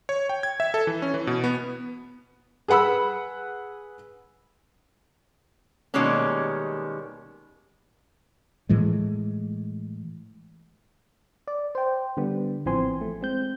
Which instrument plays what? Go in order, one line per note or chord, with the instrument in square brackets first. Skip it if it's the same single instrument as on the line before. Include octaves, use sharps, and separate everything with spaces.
[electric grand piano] C#5
G5
G#6
E5
A4
E3
C#4
E3
B2
B3
[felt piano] G#4 B4 F#5 B5 E6
[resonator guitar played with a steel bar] B2 D#3 G3 G#3 A#3 C#4
[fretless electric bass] A2 E3 G#3
[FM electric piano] D5
C5 G5
D3 G3 B3
A1 E3 F3 C4 G#5 C6
A3
G#3 C4 G6